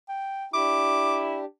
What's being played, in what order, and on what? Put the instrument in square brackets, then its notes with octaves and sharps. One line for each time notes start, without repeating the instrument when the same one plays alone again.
[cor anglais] G5
[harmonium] D4 G4 [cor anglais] E4 [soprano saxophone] D6